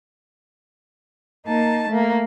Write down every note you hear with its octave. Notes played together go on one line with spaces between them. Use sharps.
A#3 D#4 A5
A3 A#3